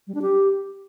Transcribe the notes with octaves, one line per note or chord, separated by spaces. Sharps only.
G3
D4
G4